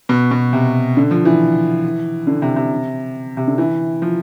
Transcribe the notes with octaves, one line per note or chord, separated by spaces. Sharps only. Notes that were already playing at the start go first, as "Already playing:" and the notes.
B2
B2
C3
D3
F3
E3
D3
C3
C3
C3
D3
E3
F3